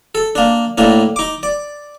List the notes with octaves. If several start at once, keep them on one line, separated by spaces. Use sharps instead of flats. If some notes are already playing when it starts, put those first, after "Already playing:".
A4
A#3 D4
A2 A#3 D4
D#4 D6
D5